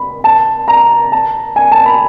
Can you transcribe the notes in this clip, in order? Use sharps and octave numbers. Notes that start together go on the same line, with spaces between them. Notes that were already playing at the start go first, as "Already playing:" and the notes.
Already playing: B5
A5
A#5
A5
G#5
A5
B5